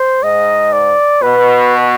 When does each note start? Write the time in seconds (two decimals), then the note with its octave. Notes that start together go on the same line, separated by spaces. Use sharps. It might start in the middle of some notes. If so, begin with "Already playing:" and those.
Already playing: C5
0.23 G#2 D#5
0.73 D5
1.22 B2 B4